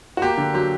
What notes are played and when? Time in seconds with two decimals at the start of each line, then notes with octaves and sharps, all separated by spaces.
0.17 F#4
0.22 A#3 G4
0.38 D3
0.54 F#3 G4